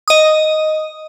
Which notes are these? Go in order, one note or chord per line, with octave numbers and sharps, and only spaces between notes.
D#5 D#6